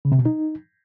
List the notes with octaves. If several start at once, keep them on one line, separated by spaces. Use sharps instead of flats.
C#3
C3
B2
D#4